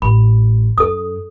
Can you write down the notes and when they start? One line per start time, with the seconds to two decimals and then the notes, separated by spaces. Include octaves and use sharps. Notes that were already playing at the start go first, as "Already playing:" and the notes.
0.02 A1 B5
0.78 F#2 A4 D#6